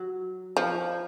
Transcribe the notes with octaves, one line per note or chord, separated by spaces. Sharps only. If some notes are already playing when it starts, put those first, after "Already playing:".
Already playing: F#3
F3